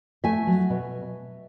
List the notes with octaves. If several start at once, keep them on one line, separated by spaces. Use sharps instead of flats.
A3 E5 G#5
F#3
B2